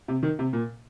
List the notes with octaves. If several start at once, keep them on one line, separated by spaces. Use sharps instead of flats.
C3
D#3
C3
A#2